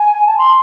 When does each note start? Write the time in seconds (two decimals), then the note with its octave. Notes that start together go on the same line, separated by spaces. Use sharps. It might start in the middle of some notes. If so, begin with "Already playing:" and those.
Already playing: G#5
0.27 A5
0.38 C6